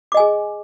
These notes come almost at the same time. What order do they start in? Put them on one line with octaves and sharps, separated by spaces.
D6 D#5 G#5 G#4